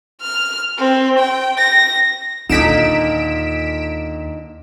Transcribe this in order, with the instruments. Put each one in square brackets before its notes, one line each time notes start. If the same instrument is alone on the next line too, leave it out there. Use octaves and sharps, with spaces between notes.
[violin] F6
C4
G5
A#6
[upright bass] D#2 [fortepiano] A#2 D3 [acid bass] D#4 [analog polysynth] B6 D7 E7